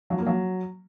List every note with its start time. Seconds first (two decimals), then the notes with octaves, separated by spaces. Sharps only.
0.10 F#3
0.18 A#3
0.26 F#3